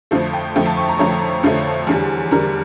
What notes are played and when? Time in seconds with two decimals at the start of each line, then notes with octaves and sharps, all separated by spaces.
0.11 F2 D3 F3 A3
0.33 G5
0.56 F2 D3 F3 A3 G5
0.66 A5
0.77 C#6
0.88 A#5
0.99 F2 D3 F3 A3 C#5
1.43 F2 D3 F3 A3
1.87 E2 D3 G3
2.31 E2 D3 G3 A#4